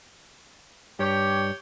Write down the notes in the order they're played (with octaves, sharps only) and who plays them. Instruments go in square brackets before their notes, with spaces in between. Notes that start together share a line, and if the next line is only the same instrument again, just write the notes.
[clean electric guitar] G2 [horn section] G4 C#5